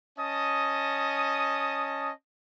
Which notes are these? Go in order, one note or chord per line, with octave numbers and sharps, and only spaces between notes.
C#4 D#5 A5 D#6